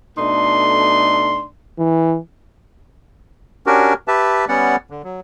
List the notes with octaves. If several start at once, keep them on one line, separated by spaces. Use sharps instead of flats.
B2 A3 D4 D#4 A4 C6
E3
C#4 D4 F#4 G4 A#4
G4 B4 E5 A5
G3 B3 C#4 D5 F#5
D3
F#3